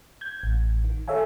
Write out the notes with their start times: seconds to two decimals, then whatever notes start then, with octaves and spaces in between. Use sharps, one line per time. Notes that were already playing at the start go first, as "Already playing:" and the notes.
0.21 G6 G#6
0.43 A1
0.84 D#3
1.08 A4 C#5 E5 F5 G#5